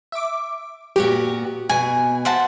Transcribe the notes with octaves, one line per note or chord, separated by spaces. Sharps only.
E5 D6
A#2 B3 F#4 G4
B2 G#5
C5 E5 F#5 A5